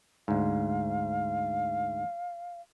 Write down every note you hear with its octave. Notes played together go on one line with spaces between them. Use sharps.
D2 G#2 F5